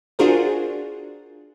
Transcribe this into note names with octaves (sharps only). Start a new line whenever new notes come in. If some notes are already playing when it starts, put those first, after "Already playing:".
D4 F4 F#4 G#4 A#4 C5